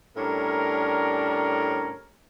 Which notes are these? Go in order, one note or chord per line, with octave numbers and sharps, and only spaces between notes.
A2 G3 C#4 D4 A#4